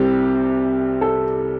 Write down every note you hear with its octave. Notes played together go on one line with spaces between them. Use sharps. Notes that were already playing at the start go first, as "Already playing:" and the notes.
Already playing: C2 C3 G3 C4 G4
A4